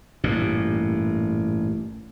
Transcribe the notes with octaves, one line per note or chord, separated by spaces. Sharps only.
A1 G2 A#2